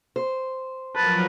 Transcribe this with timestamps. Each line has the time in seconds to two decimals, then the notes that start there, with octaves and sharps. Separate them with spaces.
0.16 C5
0.96 F3 F#3 A#4 B4 A5